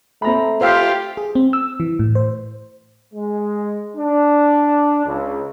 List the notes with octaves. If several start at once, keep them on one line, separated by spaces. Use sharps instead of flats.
A3 C4 A#5 B5
F4 G4 C5 E5 F5
G#4
C4
E6
E3
A2
C5
G#3
D4
C#2